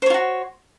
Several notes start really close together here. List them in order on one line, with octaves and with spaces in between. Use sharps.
C5 C#5 F4 F#4